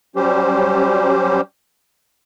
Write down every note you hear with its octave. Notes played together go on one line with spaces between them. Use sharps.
F#3 G3 C#4 G4 C5